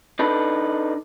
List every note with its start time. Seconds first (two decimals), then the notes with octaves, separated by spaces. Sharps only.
0.19 D4 D#4 A4 B4